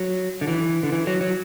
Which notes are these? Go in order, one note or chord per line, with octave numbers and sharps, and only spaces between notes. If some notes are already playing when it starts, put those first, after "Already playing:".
Already playing: F#3
D3
E3
D3
E3
F#3
F#3